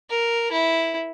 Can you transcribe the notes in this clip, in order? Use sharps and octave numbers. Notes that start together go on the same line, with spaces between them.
A#4
E4